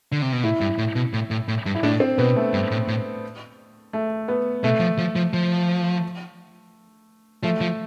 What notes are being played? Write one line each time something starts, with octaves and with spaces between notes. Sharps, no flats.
D3
C3
B2
A2 E4
G2
A2
B2
A2
A2
A2
G2
E4
A2 D4
C4
B2 B3
A3
G2
A2
A2
A3
B3
B2 A3
F3
F3
F3
F3
F3 A3
F3